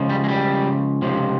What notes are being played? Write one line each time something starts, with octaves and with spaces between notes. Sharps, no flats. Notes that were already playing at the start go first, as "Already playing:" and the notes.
Already playing: C#2 C#3 F3
G3
G#3
G3
C#2 C3 F3